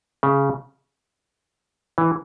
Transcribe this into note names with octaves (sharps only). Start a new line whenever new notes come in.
C#3
E3